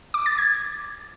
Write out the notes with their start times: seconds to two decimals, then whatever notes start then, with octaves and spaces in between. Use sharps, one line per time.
0.14 D6
0.26 A6
0.38 G#6